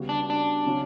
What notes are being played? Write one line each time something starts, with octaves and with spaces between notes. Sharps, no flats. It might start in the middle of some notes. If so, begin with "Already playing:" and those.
Already playing: C#3 G3 B3 F#4
D4
D4
C#3 F#3 C#4 F#4